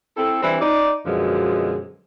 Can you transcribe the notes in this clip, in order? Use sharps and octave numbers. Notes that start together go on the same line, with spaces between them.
C4 E4 A4
E3 G3 C4 D4 E4
D#4 D5
F#2 B2 D3 F3 G#3